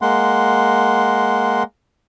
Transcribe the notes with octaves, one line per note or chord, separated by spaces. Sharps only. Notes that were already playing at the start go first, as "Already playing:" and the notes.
G#3 A#3 F#5 C6